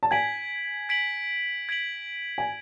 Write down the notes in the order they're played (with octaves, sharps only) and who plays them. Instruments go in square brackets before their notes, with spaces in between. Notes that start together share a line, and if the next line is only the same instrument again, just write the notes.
[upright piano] A5
[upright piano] G#5 [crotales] G#6 B6 D7 F#7
[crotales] G#6 B6 D7 F#7
G#6 B6 D7 F#7
[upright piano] G#5